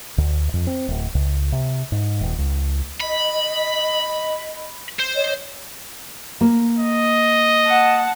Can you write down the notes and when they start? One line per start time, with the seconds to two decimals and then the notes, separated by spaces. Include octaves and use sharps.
0.18 D2
0.53 F2
0.67 C4
0.88 D1
1.15 C#2
1.52 C3
1.92 G#2
2.21 D#1
2.38 C#2
3.00 D#5 B5
4.99 C5
5.15 C#5 D#5
6.41 A#3
6.79 D#5
7.68 F#5 A5